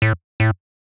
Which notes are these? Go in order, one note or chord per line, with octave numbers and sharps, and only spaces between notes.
A2
A2